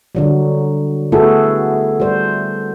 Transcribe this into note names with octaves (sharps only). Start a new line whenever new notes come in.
D3 F#3 G3
A3 B3 E4 F#4 G#4 A4
G3 C5